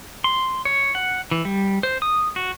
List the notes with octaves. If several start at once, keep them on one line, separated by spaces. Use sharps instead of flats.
C6
C#5
F#5
E3
G3
C5
D#6
F#4